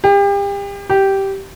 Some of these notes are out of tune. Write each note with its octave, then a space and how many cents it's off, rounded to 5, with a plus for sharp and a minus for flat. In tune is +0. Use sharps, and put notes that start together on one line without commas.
G4 +35
G4 -10